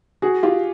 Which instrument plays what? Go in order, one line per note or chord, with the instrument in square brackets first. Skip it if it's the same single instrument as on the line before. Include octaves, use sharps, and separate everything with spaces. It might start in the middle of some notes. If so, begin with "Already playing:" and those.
[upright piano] F#4 G#4
F4 G4